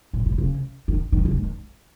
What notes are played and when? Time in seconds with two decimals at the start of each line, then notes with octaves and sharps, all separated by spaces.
0.13 A#2
0.26 A2
0.38 C#3
0.88 D#3
1.12 D#3
1.25 C#3
1.38 D#3